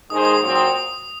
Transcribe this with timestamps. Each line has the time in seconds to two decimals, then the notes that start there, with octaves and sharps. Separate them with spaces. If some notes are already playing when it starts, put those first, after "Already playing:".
0.10 D#3 G#3 D#4 G#4 C5 D#6
0.25 D#6
0.40 A#2 F#3 C4
0.56 D#6